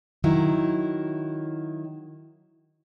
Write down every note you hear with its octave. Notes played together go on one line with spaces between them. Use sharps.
D#3 F#3 E4